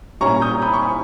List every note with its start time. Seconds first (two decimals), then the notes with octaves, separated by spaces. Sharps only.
0.21 A#2 G3 A#3 C#4 E4 A#5 C#6
0.42 D#6 G6
0.62 B5 D#6
0.74 C#6
0.82 G#5 B5